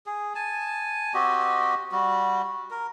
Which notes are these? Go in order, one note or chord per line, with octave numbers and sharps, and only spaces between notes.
G#4
G#5 A5
C4 F#4 G4 D#5
G3 F#4
A#4